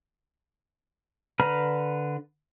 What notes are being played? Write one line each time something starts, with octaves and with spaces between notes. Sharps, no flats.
D3 B4 A#5 B5 F6